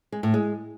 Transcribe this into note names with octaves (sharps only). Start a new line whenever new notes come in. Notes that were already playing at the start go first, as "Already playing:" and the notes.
G#3
A2
G#3